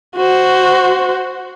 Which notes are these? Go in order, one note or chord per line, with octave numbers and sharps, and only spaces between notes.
F#4 C5